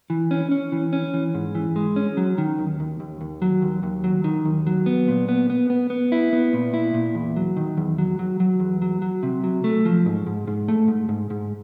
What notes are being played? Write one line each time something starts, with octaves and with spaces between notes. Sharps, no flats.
E3
C#4
C#4
E3
C#4
E3
G#2
E3
G#3
C#4
F#3
D#3
D#2
D#2
D#2
D#2
F#3
D#2
D#2
F#3
D#3
D#2
F#3
B3
A#2
B3
B3
B3
B3
E4
B3
A#2
E4
A#2
E2
F#3
D#3
E2
F#3
F#3
F#3
E2
F#3
F#3
C3
F#3
A3
F3
G#2
G#2
G#2
A3
G#2
G#2
G#2